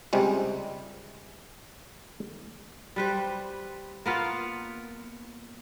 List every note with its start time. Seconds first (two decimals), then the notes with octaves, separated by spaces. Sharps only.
0.13 C#2 C3 G3 G#3
2.96 G3 B4 C5
4.06 A#3 B3 F4